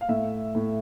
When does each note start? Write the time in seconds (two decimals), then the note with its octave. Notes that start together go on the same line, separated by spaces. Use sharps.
0.01 F5
0.09 A2 E5
0.55 A2